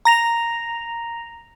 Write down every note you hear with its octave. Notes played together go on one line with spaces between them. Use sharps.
A#5 A#6 F7